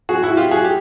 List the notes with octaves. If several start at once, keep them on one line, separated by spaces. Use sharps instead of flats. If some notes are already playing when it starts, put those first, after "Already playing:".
F#4 G#4
E4 F#4
F4 G4
F#4 G#4
G4